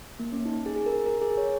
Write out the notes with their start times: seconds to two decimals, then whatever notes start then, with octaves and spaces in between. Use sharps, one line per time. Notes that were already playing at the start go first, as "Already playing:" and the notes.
0.20 A#3
0.32 C#4
0.45 D#4
0.66 G#4
0.76 G#4
0.86 A#4
1.06 A#4
1.21 G#4
1.37 C#5